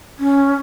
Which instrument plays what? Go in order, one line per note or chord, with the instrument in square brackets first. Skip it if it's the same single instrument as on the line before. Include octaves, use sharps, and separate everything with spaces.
[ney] C#4